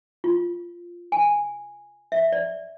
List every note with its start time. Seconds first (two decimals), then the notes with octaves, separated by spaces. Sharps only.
0.24 F4
1.12 G#5
2.12 E5
2.32 D5